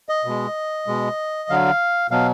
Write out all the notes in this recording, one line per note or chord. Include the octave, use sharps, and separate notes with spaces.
D#5
B2 G#3
B2 G#3
D3 F#3 F5
B2 F#3 F5